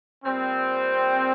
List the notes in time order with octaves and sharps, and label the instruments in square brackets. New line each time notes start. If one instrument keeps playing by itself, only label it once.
[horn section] A#2 G3 C4